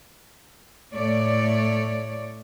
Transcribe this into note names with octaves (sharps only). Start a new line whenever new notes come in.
A2 A3 C#5 D5